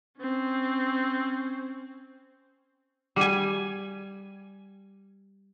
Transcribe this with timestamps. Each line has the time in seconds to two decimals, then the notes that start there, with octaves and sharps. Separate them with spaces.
0.20 C4 C#4
3.16 G3 G#5